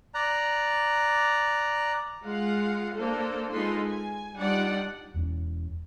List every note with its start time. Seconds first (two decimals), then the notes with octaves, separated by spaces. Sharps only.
0.14 D5 A#5 F#6
2.23 G#3 F4 F5 F#5
2.97 A#3 D4 A4 C5
3.52 G#3 D#4 F4 A4 B4 C6
3.86 G#5
4.37 G3 D4 D#4 F4 D5 F#5
5.14 E1 E2 D#3 C#4